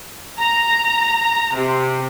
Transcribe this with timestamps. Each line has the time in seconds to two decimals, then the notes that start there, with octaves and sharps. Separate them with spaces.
0.40 A#5
1.55 C3